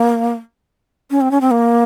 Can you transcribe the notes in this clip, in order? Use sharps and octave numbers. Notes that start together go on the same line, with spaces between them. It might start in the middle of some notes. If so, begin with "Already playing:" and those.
Already playing: A#3
C#4
C4
C#4
C4
A#3